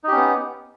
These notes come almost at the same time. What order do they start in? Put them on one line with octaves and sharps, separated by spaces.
D#4 G4 C#4 B3